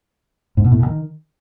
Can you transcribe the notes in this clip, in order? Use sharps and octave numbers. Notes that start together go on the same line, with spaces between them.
G#2
B2
A2
B2
D#3